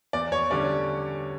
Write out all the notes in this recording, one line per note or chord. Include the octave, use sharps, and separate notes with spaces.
E2 D5
C#5
D3 G3 C#4 D5